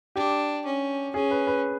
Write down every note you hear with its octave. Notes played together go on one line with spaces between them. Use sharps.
D4 G4
C#4
C#4 G#4
B4
B4